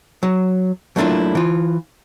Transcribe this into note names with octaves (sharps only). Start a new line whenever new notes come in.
F#3
F#3 A3 A#3 D4 E4 F4
E3 F4